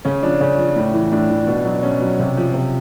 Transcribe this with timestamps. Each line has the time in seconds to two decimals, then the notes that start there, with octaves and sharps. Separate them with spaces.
0.05 C#3 C#4
0.23 F3 D4
0.41 C#3 C#4
0.58 F3
0.76 A2
0.94 E3
1.12 A2 D4
1.30 E3
1.47 B2
1.65 F#3
1.83 B2 C#4
2.01 F#3
2.19 C3
2.37 F3
2.54 C3